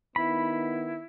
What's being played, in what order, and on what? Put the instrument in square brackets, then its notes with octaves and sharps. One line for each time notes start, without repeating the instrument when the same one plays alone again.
[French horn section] D#3 B3 D#4 [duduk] E4 [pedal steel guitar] B5